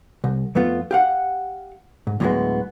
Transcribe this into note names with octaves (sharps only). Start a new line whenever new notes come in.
C2
F2 A3 B3 F4
G4 F5 F#5
G#2
D2 A2 D3 F#3 G#3 B3